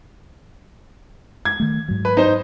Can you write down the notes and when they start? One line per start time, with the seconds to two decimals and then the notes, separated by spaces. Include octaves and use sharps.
1.45 G#6
1.60 D#3 A3
1.88 G#2 F#3
2.05 B4
2.17 D#4 C5